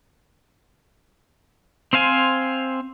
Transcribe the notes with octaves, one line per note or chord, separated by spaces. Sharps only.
C4 C5 F5 G#5